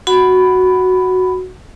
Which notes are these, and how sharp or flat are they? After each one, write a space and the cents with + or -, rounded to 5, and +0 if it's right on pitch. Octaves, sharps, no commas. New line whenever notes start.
F#4 +0 F#5 +0 B5 +10